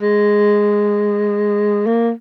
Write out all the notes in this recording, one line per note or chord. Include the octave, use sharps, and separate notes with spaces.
G#3
A#3